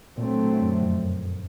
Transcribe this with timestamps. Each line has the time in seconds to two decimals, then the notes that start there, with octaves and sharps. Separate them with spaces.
0.17 A#2 D3 F#3 A3 C4
0.62 F#2
0.83 F2
1.04 F#2